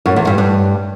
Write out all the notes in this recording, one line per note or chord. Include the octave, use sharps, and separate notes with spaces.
F#2
E2
G2
G2